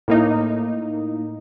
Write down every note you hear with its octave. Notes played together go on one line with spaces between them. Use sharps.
A2 A#3 D#4